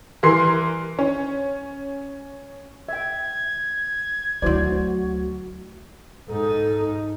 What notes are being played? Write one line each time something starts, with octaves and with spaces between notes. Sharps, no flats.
E3 G3 A#4 C6 C7
C#4
E5 G5 G#6
D2 F#3 E4 F#4 C5 D5
G#2 D#4 A4